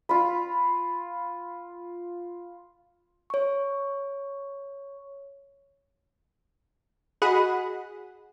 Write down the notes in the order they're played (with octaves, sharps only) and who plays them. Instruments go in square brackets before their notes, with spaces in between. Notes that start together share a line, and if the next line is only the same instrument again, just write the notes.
[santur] F4 B5
[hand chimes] C#5 C#6
[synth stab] F#4 G#4 D#5 F#5 B5